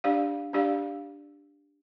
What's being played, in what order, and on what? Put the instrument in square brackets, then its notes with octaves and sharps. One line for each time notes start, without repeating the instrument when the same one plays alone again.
[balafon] D4 G4 D5 F5
D4 G4 D5 F5